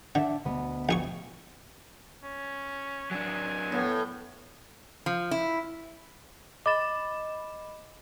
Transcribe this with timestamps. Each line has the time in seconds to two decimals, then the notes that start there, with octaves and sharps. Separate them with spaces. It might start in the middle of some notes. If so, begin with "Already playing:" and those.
0.15 D3 D4 E5
0.45 D2 B2 B3
0.89 A#1 G#4 C#6
2.23 C#4
3.11 F#3 D4 G#5
3.72 A2 B3
5.06 F3
5.31 E4
6.66 D#5 B5 D6 A6 E7